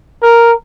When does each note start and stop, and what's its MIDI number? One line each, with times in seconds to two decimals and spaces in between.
0.22 0.52 70